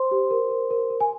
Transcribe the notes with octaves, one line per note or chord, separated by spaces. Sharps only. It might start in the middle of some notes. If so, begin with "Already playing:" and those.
Already playing: C5 C6
G4
A#4
A#4
A#4
A#4
G#5